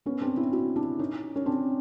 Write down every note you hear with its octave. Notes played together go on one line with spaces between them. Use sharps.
B3 C#4
C4 D4
D4 E4
E4 F#4
D4 E4
C#4 D#4
C#4
C4 D4